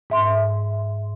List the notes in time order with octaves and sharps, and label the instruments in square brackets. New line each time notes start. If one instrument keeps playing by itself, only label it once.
[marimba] G#2 E5 C6